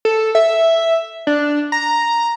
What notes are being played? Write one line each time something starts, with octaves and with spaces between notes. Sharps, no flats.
A4
E5
D4
A#5